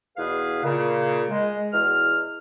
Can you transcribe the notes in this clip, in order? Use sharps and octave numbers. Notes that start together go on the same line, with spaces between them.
E2 B2 G#4 B4 F5
A#2 C#3
G#3
E2 B2 F6